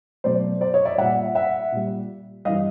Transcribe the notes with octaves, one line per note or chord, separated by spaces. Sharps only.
B2 F#3 A3 C5 D5
C5 D5
C#5 D#5
D5 E5
A#2 G3 E5 F#5
E5 F#5
A#2 G3
G2 E3 G3 D#5 F5